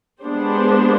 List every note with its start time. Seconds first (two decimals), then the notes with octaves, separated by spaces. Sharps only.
0.21 G#3 B3 D4 G4 C5